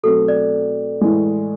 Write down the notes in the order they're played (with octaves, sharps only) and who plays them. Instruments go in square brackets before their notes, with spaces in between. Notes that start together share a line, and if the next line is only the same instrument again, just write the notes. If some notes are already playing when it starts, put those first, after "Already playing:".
[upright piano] B2 F#3 A3 C4 [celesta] A4
[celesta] D5
[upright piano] A2 E3 G#3